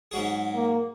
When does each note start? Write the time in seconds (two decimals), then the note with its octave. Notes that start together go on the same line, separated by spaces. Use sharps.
0.11 G#2 F#3 G#4
0.54 A#3